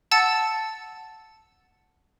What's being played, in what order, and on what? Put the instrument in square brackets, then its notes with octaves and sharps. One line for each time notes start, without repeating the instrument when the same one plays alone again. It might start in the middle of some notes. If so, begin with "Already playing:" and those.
[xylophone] F#5 A5 E6 A6 C#7